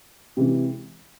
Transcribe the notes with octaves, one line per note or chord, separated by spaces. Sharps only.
C3 E3 G#3